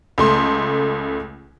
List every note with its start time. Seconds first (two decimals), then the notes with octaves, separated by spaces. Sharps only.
0.18 C#2 A3 C6